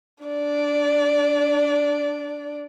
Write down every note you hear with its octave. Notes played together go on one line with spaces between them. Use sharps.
D4 D5